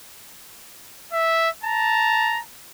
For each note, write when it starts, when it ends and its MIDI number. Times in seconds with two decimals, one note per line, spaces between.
1.13 1.50 76
1.63 2.43 81
1.63 2.39 82